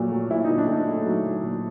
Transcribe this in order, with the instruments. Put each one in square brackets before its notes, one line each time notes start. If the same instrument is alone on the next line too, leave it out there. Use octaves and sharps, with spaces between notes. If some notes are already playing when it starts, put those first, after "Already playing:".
Already playing: [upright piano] A#2 F#3 A3
F#3
A#2 E4
A#2 D#4
D4
A#2 D#4
A3
F#3
F#3
A#2